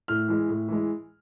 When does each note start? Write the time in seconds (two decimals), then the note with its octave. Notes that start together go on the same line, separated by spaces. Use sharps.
0.08 A2 F6
0.28 E3 G#3
0.49 A2
0.68 E3 G#3